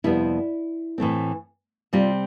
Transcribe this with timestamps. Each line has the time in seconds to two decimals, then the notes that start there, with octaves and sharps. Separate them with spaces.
0.04 F2 C3 G3 B3 E4
0.98 A2 E3 A3 C4
1.93 C3 G3 C4 F4